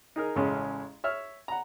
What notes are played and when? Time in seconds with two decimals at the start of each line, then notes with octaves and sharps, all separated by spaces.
0.16 D#4 G#4 A#4
0.36 A1 C#3 G#3 C#4
1.04 C#5 E5 F6
1.48 F#5 A#5